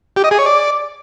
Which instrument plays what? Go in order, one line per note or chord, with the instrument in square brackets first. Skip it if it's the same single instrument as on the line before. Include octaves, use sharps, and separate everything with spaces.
[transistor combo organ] G4
D#5
G#4
C#5
D5